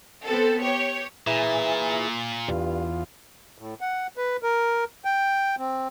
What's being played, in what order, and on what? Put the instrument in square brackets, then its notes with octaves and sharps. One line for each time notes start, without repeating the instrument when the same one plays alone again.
[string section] B3 C4 A4
G4 C#5
[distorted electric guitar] A#2 [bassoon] E3 [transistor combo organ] E4 G#4
[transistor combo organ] E2 F4 [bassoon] G2
[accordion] A2
F#5
B4
A#4
G5
C4